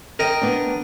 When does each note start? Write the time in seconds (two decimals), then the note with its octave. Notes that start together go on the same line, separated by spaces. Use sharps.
0.19 A#4 D#5 G5
0.41 B3 D4